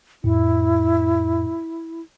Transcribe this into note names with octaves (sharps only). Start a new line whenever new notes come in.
F2 A2 E4